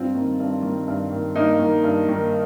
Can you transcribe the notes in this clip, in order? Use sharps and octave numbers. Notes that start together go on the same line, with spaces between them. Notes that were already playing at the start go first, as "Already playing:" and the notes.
Already playing: G2 C4 F4
D#3
G2
D#3
G2
D#3
G2 A#3 D#4
D#3
G2
D#3